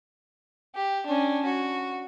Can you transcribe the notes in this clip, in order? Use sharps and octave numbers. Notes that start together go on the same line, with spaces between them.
G4
C#4 D4
F#4